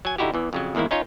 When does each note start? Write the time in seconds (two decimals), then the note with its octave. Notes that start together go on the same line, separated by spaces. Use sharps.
0.05 F#3 G#5
0.18 D3 D#4 E4 F#4 G4
0.34 E2 E3
0.53 F2 C#3 F#3
0.75 E2 G#2 D#3 A#3 E4
0.91 C#4 D#4 F4 C#5